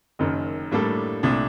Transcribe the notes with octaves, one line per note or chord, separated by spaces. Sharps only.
F#1 F#2 D#3
A2 G3 A#3 D4 A4
C2 A#2 A3 D4